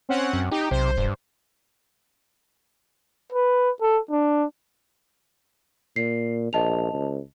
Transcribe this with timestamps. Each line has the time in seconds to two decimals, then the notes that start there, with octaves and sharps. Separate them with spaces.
0.09 C4 C#4 F#5
0.33 F#2
0.51 D#4 G4
0.71 B1 C3 C5
0.98 E1 G2
3.32 B4
3.82 A4
4.11 D4
5.96 A#2 C7
6.53 A#1 D#5 A5 F7
6.93 C#2